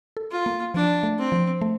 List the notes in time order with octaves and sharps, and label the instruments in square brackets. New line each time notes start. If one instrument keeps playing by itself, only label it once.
[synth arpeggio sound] A4
[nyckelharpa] F4
[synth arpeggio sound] A#3
[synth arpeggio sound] F3 [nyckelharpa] D4
[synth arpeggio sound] A3
[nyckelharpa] C4
[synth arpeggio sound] F3
A3